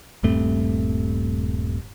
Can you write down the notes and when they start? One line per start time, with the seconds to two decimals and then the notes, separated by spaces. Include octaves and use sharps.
0.23 D#1 G2 A3 C4